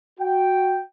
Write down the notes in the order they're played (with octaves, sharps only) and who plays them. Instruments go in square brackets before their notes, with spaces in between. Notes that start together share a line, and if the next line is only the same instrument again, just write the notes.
[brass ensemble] F#4 G5